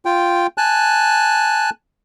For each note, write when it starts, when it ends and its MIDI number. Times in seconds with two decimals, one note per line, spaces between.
0.05 0.47 65
0.05 0.47 79
0.58 1.70 80
0.58 1.70 81
0.58 1.70 90